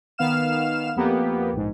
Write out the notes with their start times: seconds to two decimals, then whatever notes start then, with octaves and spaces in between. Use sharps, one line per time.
0.18 D#3 B3 F5 F6 E7
0.96 F2 A#3 B3 G4
1.53 A#1 G#2